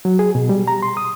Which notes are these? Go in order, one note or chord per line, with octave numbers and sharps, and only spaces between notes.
F#3
G#4
B2
G3
A#5
C6
D#6